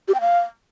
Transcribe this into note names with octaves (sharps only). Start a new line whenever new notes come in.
G4
G5
F5